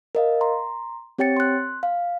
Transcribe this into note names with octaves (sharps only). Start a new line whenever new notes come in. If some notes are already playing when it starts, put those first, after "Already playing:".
A#4 D#5 F5
A#5 C6
C4 G4 C#5 G5 A6 C#7
C6 F#6
F5